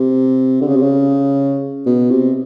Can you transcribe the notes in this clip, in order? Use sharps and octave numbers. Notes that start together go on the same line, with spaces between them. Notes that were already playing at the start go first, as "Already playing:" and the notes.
Already playing: C3
D3
C#3
C3
C#3
B2
C3